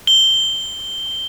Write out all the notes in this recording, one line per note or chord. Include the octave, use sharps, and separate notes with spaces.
G7